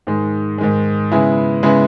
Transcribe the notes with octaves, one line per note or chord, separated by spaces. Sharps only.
G#2 D#3 G#3
G#2 D#3 G#3
C#3 G#3 B3 E4
C#3 G#3 B3 E4